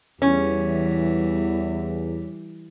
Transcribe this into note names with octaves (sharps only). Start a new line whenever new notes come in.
E2 E3 G3 C#4